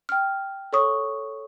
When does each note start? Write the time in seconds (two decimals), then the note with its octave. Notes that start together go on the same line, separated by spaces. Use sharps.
0.09 G5 F6
0.73 A4 C#5 C#6 D#6